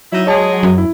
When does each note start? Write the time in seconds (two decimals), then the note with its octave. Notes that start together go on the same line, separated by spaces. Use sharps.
0.12 F#3 D#4 E4 E5
0.27 G#3 G#4 C#5 D#5 A5
0.63 F#2
0.78 E4